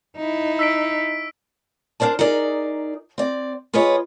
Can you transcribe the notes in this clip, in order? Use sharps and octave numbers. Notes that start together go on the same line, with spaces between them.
D#4 E4
E6 B6 D7
D4 A#4 C5 D5 A5
D#4 G#4 A#4 D5
C4 D5
F4 G#4 B4 C#5 D#5